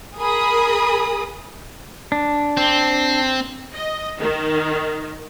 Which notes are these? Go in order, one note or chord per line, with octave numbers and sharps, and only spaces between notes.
G#4 A#4 B5 D#6
D4
C4
D#5
D#3